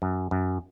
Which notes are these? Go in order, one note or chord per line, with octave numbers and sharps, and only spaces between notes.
F#2
F#2